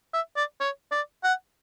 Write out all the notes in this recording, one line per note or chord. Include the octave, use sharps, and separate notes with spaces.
E5
D5
C#5
D5
F#5